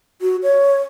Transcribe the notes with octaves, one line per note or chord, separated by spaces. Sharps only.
F#4
C#5